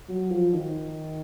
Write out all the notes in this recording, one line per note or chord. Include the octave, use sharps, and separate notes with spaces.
F#3
F3
D#3